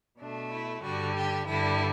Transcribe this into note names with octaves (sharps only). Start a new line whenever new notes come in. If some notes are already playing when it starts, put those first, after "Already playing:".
B2 A3 D4
E4
G2 D3 G3 F#4
G4
G2 D3 G3 E4